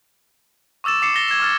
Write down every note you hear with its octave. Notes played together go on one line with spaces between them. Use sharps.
C#6 D6 E6 A6 E7
D6 C7 C#7 E7
A6 A#6 G7
G#6 E7
C#6 F6 A6